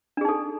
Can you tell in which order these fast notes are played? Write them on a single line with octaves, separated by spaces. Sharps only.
D4 G#4 D#4 A4